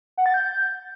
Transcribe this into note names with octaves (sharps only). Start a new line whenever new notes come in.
F#5
A6
G6